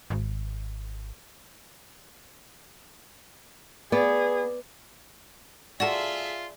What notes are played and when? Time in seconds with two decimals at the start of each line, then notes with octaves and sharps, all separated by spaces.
0.10 G#1
3.92 B3 G#4 D5
5.80 F4 F#4 G#4 A4 D5 E5 A5